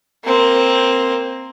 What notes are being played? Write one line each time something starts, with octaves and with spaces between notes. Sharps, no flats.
A#3 C4